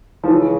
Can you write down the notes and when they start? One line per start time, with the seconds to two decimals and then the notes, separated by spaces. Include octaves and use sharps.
0.24 F3
0.28 C#2 C#3 E3